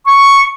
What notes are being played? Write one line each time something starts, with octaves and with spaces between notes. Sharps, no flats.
C#6